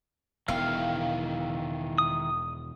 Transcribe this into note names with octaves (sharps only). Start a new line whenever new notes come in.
E1 D#3 B3 E4 F5 G5
D#6